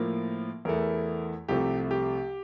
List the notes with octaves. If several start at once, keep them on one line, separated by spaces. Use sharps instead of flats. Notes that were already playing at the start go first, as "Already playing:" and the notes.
Already playing: A2 F3 A#3 A#4
E2 E3 A3 A#4
C2 C3 F3 A3 G4
G4